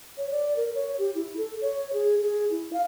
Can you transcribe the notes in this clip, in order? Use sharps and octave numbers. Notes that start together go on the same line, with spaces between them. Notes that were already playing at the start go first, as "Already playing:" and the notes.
C#5
D5
A#4
C#5
G4
E4
A4
C#5
G#4
G#4
E4
F5